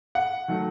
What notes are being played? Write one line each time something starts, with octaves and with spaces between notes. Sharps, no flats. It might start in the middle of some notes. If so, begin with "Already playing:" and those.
F#5
D#3 F#3 A3